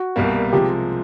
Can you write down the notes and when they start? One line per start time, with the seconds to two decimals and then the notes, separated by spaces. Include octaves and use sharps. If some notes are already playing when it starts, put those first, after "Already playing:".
Already playing: F#4
0.16 C2 B2 G3 A#3
0.53 C3 F3 G#3 G4